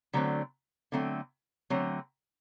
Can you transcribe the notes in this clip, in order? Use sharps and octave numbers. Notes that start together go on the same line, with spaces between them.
D3 F#3 A3 C4
D3 F#3 A3 C4
D3 F#3 A3 C4